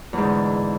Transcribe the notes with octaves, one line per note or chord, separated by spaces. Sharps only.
E2 G#2 D3